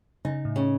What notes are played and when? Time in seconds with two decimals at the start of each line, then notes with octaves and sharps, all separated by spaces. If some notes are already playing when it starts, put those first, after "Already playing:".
0.25 C#3 D#4
0.45 A2
0.56 C#3